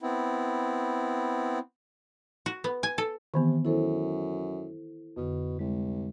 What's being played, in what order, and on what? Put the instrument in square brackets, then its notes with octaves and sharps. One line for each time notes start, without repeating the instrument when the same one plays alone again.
[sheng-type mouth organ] B3 C4 E4
[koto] F#4
B3
G#5
A4
[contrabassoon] C3 [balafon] D#3 E3 B3
[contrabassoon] F#2 [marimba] E4 A4 C5
[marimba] F2 D3 [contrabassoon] B2
[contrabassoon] C2 [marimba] G#3